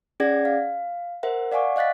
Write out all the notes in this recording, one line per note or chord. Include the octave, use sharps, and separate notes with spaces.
C#4 G#4 D5 F#5 G#6 A#6
F5
A#4 C5 E5 F#5
D5 F5 F#5 G#5 C#6 D6
D#5 F5 F#6 A6 B6